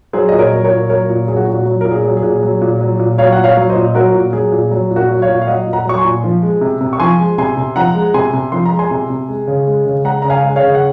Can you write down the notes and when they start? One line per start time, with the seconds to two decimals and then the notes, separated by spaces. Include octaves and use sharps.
0.13 F#3 G#4 C5
0.29 A#2 D#5
0.39 A#4 C#5
0.51 F#3
0.64 A#4 C#5
0.71 A#2
0.89 F#3 A#4 C#5
1.09 A#2
1.28 F#3 G#4
1.37 F#4
1.47 A#2
1.55 F#4
1.66 F#3
1.81 A#2 A#4
1.91 G#4
2.04 F#3
2.17 G#4
2.23 A#2
2.42 F#3
2.61 A#2
2.81 F#3
2.99 A#2
3.18 F#3 C#5 F5
3.32 F#5
3.38 A#2
3.44 C#5 F5
3.57 F#3
3.70 C5 D#5
3.76 A#2
3.95 F#3 F#4 A#4
4.14 A#2
4.33 F#3 G#4
4.52 A#2
4.71 F#3
4.91 A#2
4.96 F#4 A#4
5.09 F#3
5.22 C#5 F5
5.28 A#2
5.42 F5
5.47 F#3 D#5 F#5
5.67 A#2
5.73 F#5 A#5
5.85 F#3 C#6
5.98 G#5 C6
6.05 A#2
6.24 F3
6.43 G#3
6.61 C3
6.81 C3
6.93 C#6
7.00 F3 G#5 C6
7.19 G#3
7.38 C3 G#5 C6
7.57 C3
7.76 F3 F#5 A#5
7.95 G#3
8.14 C3 G#5 C6
8.33 C3
8.52 F3 C6
8.66 A#5
8.72 G#3
8.79 G#5 C6
8.91 C3
9.10 C3
9.28 G#3
9.47 C#3
9.67 G#3
9.86 C#3
10.04 G#3 F#5 A#5
10.22 C#3 A#5
10.30 F5 G#5
10.43 G#3
10.56 C#5 F5
10.62 C#3
10.75 F#5